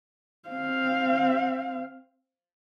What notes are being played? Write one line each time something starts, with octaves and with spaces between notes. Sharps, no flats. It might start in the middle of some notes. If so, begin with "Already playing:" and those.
C4 F5